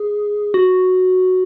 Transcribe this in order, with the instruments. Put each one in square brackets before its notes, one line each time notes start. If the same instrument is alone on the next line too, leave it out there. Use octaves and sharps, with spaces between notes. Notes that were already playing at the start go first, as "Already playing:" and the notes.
Already playing: [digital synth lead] G#4
F#4